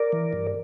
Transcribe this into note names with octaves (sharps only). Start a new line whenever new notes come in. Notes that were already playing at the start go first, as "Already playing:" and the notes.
Already playing: A#4 D5
E3
G2